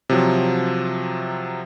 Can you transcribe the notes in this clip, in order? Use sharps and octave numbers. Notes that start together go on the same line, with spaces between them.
C3 F3 F#3